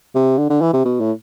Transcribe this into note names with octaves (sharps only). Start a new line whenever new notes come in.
C3
D3
D3
E3
C3
B2
A2